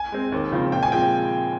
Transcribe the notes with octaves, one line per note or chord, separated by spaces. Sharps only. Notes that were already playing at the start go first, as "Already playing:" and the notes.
Already playing: G#5
G#3 C4
D#2
C#3 F3 G#3 C4
A#2 G5
G#5
F3 G#3 C4 G5